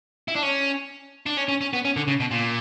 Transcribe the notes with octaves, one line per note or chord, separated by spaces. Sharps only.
E4
D4
C#4
D4
C#4
C#4
C#4
B3
C#4
D3
C#3
B2
A#2